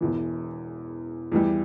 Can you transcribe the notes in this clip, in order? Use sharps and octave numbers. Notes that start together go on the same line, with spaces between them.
E1 E2 E3
E2 E3 G3